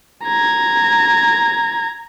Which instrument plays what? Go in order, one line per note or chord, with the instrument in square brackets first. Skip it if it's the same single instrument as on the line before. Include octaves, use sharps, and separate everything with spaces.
[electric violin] A#5 G#6